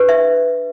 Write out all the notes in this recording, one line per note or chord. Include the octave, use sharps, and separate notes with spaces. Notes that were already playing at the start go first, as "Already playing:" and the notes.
Already playing: D4 G4 B4
E5